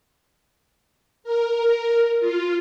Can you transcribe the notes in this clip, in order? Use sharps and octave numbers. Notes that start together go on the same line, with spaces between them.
A#4
F4